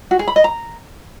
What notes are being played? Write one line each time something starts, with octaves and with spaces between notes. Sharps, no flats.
F#4
G#4
B5
D#5
A#5